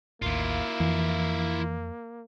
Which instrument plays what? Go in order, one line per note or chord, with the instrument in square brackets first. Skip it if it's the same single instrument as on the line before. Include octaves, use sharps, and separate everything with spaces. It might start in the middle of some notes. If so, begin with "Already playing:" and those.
[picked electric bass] A1 D#2 [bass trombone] A#3 [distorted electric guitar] E4 F4
[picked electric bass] F2 [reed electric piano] E3